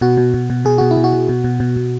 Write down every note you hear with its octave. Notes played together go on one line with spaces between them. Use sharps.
B2 F#4
B2
B2
B2
B2 G#4
B2 F#4
E4
B2
F#4
B2
B2
B2
B2
B2